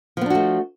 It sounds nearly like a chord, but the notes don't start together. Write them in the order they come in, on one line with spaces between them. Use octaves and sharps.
F3 B3 D4 F#4 A3